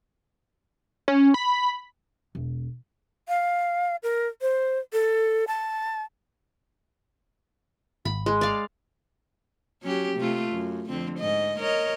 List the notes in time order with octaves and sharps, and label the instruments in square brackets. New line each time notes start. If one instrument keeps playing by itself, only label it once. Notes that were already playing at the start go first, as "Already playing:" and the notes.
[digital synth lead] C#4
B5
[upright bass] E1
[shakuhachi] F5
A#4
C5
A4
A5
[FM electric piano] G#1 [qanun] B5
[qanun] G#3
D5 F5
[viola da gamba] F#3 C#4 G4
C3 A3 F4
F#2
F2 D3 C4
G#2 D#5
A#4 C#5 D#5